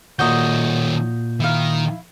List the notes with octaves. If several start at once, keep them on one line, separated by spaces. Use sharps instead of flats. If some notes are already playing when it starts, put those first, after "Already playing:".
A#2 D#3 C#4 F#4 D#5 G6
D#3 E4 F5